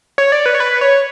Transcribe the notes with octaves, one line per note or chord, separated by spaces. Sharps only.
C#5
D5
B4
C#5
B4
C#5